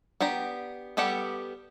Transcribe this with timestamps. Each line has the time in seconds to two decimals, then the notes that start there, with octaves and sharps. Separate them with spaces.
0.20 B3 D4 G4 A#5
0.97 G3 B3 G4 A4 F#5